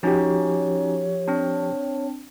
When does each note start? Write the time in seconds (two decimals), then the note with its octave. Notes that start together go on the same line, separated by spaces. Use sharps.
0.03 F3 C#4 D#4 F#4 G4 C#5
1.28 C4 D4